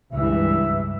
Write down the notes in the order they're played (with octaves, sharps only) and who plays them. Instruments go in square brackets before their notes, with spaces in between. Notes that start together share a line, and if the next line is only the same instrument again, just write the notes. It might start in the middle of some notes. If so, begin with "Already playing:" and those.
[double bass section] C#2 G2 E3 [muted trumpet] E5